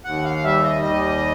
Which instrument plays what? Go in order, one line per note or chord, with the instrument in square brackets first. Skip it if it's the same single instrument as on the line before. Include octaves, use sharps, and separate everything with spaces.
[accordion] D#2 F#5
F5
G3 E5
D#5
D#2 D#5